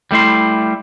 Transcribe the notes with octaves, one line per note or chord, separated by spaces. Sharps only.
G3 A3 E4 C6